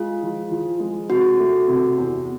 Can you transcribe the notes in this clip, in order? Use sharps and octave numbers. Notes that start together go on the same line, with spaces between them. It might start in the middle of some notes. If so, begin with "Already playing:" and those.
Already playing: G#3 F4
F3
F3
G#3
C3 F#4
A3
C3
E2